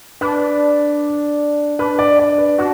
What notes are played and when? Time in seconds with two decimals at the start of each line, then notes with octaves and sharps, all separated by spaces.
0.21 D4 B4
1.79 D4 B4
1.99 D5
2.19 D5
2.38 B4
2.58 D4 F#4